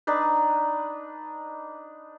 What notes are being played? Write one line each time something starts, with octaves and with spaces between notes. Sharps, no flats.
D4 D#4 B4